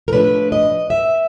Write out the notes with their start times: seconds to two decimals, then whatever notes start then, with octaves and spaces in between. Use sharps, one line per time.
0.08 A#4
0.12 A2 F3 A3 D4 B4
0.52 D#5
0.90 E5